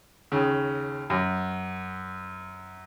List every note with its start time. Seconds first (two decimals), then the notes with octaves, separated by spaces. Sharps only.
0.32 D#2 C#3
1.10 F#2